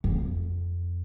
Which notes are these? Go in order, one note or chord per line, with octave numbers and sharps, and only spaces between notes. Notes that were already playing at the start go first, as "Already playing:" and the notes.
F2